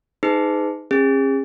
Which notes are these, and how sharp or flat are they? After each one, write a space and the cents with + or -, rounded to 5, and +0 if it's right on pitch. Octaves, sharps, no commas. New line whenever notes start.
D#4 +0 G#4 +0 B4 +45
C#4 -35 G#4 -35